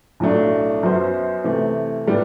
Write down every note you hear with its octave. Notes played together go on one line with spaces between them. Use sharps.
B1 A2 F#3 A3 D4
F#2 F#3 B3 F#4 C5
C3 E3 A3
A2 G3 B3